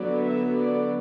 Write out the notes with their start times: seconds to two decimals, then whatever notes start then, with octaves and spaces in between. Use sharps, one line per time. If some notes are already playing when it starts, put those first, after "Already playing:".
Already playing: D3 F#3 B3 D5
0.23 E5
0.57 D5